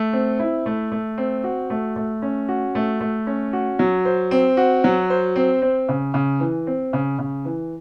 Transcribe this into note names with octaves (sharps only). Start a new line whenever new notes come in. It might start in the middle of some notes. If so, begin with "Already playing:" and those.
Already playing: A3
C4
E4
A3
A3
C4
F#4
A3
A3
C#4
F#4
A3
A3
C#4
F#4
F#3
C5
C4
F#4
F#3
C5
C4
C4
C#3
C#3
E3
C4
C#3
C#3
E3